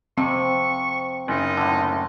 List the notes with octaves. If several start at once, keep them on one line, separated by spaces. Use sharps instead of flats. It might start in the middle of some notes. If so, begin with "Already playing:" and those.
F2 C3 C4 C#6
F#1 D#4
A2 D3